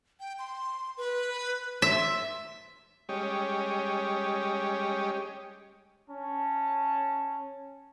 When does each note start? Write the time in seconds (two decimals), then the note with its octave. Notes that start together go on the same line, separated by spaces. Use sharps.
0.20 G5
0.39 C6
0.97 B4
1.82 E5 C6
3.09 G3 G#3 C#4 G4 C#5 D#5
6.09 C#4 A5